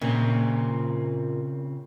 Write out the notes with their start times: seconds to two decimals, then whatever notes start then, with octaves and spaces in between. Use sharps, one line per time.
0.02 A#2 C#3 C4